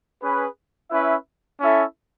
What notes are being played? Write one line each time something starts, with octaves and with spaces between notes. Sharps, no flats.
C#4 G#4 B4
C#4 E4 B4 E5
C#4 E4 A4 E5